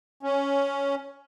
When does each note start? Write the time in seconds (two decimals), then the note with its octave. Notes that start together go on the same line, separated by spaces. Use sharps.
0.23 C#4